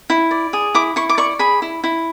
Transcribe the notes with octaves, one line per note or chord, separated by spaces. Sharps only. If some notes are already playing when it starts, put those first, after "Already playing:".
E4
D5
G#4
E4 D6
E4 C#6
D6
D5 C#6
G#4 B5
E4
E4